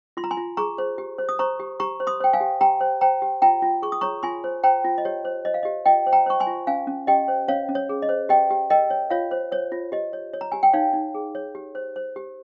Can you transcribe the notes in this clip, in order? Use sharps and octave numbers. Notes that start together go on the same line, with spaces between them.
F4 C6
A#5
G#5 C6
F4
G#4 A#5 C#6
C5
G4
C5
D#6
C5 A#5 C#6
G4
G4 A#5 C#6
C5
C6 D#6
C5 G5
F5 G#5
G4
G4 G5 A#5
C5
C5 G5 A#5
G4
F4 G5 A#5
F4
G#4 C#6
D#6
C#5 A#5 C#6
F4 G#5 C6
C5
C5 G5 A#5
F4
D#5
G4 C#5
C5
C5 D#5
F5
G4 D#5
F4 D#5 G5
C5
G5 A#5
C5 C#6
G#5 C6
F4
C#4 F5 G#5
C#4
G4 D#5 G5
C5
C#4 C#5 F5
C#4
C#5
G#4
D#5
C5
G4 D#5 G5
G4
A#4 D#5 G5
C#5
F4 C#5 F5
C5
C5 C#5
F4
G4 D#5
C#5
C#5
A#5
G4 G#5
G5
D#4 C#5 F5
D#4
G#4
C#5
G4
C5
C5
G4